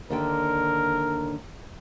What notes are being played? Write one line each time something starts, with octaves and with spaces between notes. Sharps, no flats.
D#2 D3 A#4 G5